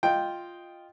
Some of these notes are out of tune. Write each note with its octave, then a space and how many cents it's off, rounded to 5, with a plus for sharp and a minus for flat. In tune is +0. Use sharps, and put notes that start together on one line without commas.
F4 +0 D#5 +0 G5 +0